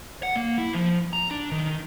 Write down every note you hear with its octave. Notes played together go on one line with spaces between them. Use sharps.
F#5
A#3
E4
F3
A#5
D4
D#3